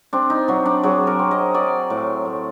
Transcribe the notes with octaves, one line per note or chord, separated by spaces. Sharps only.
C4 D4
D#4
F#3 D4
D4
F#3 G#4
A#4
C4
D#5
F#3 D5
A2
A3